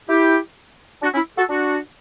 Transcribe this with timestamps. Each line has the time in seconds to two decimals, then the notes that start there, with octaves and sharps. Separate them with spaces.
0.09 E4 G4
1.02 D4 F#4
1.14 C#4 E4
1.38 F#4 A4
1.50 D4 F#4